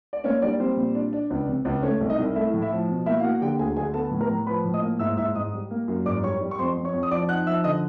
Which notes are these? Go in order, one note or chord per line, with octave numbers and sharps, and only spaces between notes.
D5
A#3 C#4 C#5
G3 D4 D5
G3 C4 C5
A#2
D4
D4
C#2
C3
C#2
A3 C#4 C#5
C2
D#4 D#5
C2
A3 E4 E5
A2
E4 E5
F3
B2
A#3 E4 E5
F5
A#3 F#4 F#5
F#5
D3 G4 G5
D2 G#4 G#5
D3 G#4 G#5
B3 A4 A5
A2
A#4 A#5
A2
F3 B4 B5
A2
D#5 D#6
A#3
G#2 E5 E6
G#2 E5 E6
G#2 D#5 D#6
G3
A#3
F#2
G#2 D5 D6
G3 C#5 C#6
G3
C#6
F2 C5 C6
F2
C#5 C#6
F2
D#6
F3 D5 D6
D#4 F#5 F#6
F3 E5 E6
D3 D#5 D#6